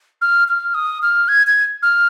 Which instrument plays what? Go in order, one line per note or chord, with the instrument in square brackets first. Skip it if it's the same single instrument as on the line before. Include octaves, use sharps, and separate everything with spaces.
[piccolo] F6
F6
D#6
F6
G#6
G#6
F6